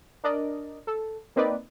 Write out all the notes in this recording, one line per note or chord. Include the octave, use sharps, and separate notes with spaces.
D4 A#4 D5 D#5
A4
A#3 C4 D#4 B4 D5 D#5